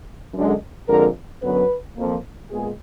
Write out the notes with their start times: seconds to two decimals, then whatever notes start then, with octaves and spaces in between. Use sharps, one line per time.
0.34 F#2 D3 G#3
0.88 F2 D3 G#3 A#4
1.42 F#2 D3 F#3 B3 B4
1.97 F2 F3 A#3
2.51 A#2 G#3 B3 G#4